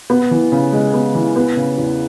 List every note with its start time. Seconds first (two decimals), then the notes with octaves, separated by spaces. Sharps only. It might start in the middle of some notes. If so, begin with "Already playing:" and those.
0.10 B3
0.31 E3
0.52 C#3
0.73 G#3
0.94 B3
1.15 E3
1.36 B3
1.57 C#3
1.78 E2